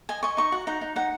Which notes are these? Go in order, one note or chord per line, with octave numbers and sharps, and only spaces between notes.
D#5 G#5
D#5 C#6
D#4 C#6
F#4 F#5
D#4 F#5
D#4
D#4 F#5